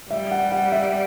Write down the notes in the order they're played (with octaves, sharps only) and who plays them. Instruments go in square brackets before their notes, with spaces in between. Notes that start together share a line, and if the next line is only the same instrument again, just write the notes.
[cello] G3 [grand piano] E5
[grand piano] F#5
F#5
E5